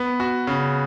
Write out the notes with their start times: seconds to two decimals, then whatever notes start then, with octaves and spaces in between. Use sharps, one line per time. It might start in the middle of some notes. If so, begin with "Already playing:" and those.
Already playing: B3
0.20 F#4
0.47 C#3